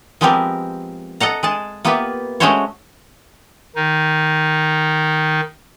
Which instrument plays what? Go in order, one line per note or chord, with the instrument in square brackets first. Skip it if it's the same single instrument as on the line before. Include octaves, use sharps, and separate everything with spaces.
[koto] F3 G#3 B3 C4 G4 A#4
A4 D#5 F#5 A#5
G#3 G#4 A5
A#3 B3 F4 G4 B4 E5
G#3 A3 C#4 F#4 C5 C#5
[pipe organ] D#3 D#4